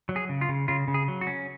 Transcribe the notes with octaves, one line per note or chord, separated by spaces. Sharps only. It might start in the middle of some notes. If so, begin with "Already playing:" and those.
F#3
G#4
C#3
F4
C#3
C#3 F4
C#3
G#4
F#3
F#4
C#4